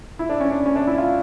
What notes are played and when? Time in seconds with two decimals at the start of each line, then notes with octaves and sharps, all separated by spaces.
0.19 E4
0.29 D4
0.40 C#4
0.51 D4
0.66 C#4
0.76 D4
0.87 E4
0.98 F4